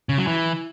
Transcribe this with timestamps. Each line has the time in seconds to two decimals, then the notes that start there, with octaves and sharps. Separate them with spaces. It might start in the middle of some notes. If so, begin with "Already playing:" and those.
0.09 C#3
0.18 F#3
0.27 E3